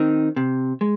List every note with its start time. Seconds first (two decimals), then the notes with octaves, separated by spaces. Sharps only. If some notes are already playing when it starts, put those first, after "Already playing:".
Already playing: D#3 C4 D#4
0.36 C3
0.81 G#3